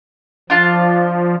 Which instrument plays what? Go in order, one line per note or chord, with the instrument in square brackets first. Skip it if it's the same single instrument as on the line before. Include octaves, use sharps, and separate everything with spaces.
[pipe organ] F3 [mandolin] D4 F4 A5